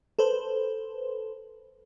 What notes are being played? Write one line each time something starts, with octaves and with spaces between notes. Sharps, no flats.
A4 B4 C5